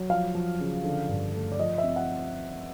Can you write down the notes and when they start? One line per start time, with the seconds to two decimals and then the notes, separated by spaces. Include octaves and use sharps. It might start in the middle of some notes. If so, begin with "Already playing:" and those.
Already playing: F#3
0.09 F3 F5
0.35 F3
0.60 C#3
0.84 D3
1.09 G2
1.34 A3
1.52 D5
1.59 F3 D#5
1.78 E5
1.83 C4
1.96 F#5